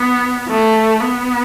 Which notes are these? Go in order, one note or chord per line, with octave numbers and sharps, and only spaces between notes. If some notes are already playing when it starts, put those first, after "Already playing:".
Already playing: B3
A3
B3